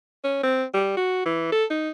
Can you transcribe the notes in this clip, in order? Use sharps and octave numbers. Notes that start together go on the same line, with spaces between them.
C#4
C4
G3
F#4
E3
A4
D#4